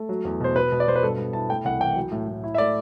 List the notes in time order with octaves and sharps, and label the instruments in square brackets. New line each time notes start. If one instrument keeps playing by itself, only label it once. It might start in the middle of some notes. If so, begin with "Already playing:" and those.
Already playing: [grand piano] A3
F#3
E2
B2 C5
B2 B4
B2
D5
B2 C5
B4
G2 A4
B3
E4 A5
A3 G5
C2 F#5
E3 G5
F#3
A2
A2
E4
E5
A3 D5